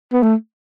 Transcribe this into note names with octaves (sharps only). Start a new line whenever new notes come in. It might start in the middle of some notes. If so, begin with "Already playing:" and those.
B3
A3